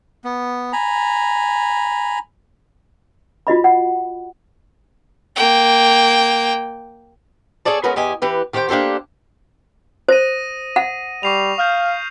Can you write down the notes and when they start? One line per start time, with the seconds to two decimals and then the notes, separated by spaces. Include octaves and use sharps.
0.24 B3
0.73 G#5 A#5 B5
3.47 F4 F#4 D#5 B5
3.64 F#5
5.36 A#3 G5
7.65 G#4 A4 C#5 D5 A5
7.83 G#3 B3 C#4 F#4 A#4 B4
7.96 E2 G4 D#5 G#5
8.22 E3 G4 B4
8.53 D#3 G4 C5 F#5 G5
8.69 A#3 D4 G4 A4 C5
10.08 C5 D#6 A#6 D#7
10.76 F#5
11.23 G3 C#6 C7 F7
11.58 F5 D#6 F6 G6